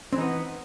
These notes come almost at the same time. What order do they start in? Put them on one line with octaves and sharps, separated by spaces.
C4 E3 D#4 B3